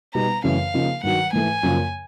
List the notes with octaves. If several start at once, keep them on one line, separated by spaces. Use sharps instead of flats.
B2 G3 B3 D#4 A#5
F#2 C#3 E3 A3 C#4 F5
C#3 F3 A#3 D#4
G2 D#3 F#3 F#5
G#2 E3 A3 G#5
F#2 C#3 F3 A#3